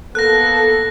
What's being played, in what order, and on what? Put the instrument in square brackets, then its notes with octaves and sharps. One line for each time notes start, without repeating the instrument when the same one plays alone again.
[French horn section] A#3 B3 A4 [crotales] F#6 A#6